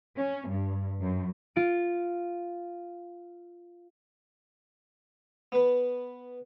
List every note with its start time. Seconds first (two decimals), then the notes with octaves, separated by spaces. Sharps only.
0.17 C#4
0.49 G2
1.00 F#2
1.56 F4 D7
5.52 B3 B4